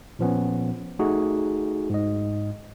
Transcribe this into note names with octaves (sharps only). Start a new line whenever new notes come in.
A#2 F3 B3 C#4
A3 D#4 F#4 G#4
G#2 D#5